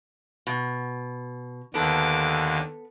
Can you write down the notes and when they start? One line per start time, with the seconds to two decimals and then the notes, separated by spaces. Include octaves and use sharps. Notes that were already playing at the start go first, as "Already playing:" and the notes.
0.47 B2
1.74 D#2 D3 B3 A4 D6